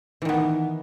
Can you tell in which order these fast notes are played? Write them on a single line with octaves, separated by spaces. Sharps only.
E3 D#3 B3